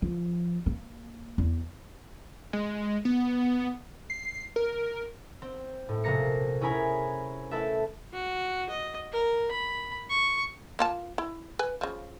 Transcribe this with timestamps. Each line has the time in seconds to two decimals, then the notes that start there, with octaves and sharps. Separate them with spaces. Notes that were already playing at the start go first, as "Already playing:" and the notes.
0.02 F3
0.66 A#3
1.38 E2
2.53 G#3
3.05 B3
4.10 C7
4.56 A#4
5.42 C4
5.89 A2
6.04 A#1 C3 A#3 A#6 C#7
6.61 C#4 E4 G#4 A#4 G#5 B5
7.51 A3 E4 A4 B4 E5
8.13 F#4
8.70 D#5
9.12 A#4
9.51 B5
10.10 C#6
10.79 A#3 F4 A5
11.18 E4
11.59 B4 G#5
11.81 C#3 F3